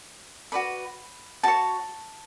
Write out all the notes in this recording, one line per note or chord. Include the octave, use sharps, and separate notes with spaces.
F#4 B4 D5 B5
F#4 C#5 A5